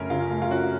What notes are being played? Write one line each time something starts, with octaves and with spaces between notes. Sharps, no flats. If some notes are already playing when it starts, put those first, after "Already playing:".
Already playing: F#2 C#3 A3 C#4 A#4
C#3 F4
A3
F4
C#4 F#4